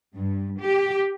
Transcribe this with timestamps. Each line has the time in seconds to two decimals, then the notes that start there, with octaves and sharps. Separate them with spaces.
0.14 G2
0.59 G4